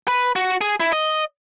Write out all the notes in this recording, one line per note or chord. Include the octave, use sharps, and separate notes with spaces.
B4
F#4
G#4
E4
D#5